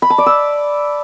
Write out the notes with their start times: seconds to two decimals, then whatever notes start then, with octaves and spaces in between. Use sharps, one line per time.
0.02 B5
0.10 A5
0.18 D5
0.26 E6